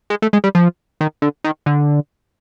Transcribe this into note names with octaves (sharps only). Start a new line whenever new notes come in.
G#3
A3
G#3
G3
F3
D#3
D3
D#3
D3